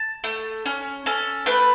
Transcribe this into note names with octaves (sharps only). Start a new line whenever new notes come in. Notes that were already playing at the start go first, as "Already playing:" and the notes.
Already playing: A5
A3
C#4
C#4 A4
A3 B4